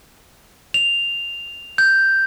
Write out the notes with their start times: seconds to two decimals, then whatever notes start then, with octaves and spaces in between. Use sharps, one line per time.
0.74 F7
1.78 G6